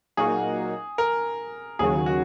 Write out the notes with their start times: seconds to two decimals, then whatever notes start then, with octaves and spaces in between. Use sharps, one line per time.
0.17 A#2 F#3 A#3 D#4 F#4 G#4
0.98 A#4
1.79 D#2 C#3 F#3 G#4
2.06 F#4